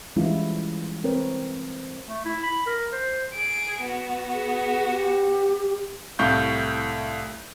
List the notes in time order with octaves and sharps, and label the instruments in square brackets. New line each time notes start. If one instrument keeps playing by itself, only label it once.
[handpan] E3 G3 G#3 C#4 E4 F4
C4 A#4 B4 C#5
[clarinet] A3
E4
B5
A#4
C5
[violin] G#4 D7
B3 F#4
[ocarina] G#4
G4
[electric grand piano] C2 A2 F5 C#6 G6